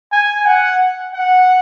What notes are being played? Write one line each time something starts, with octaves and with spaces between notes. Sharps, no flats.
G#5
F#5
F#5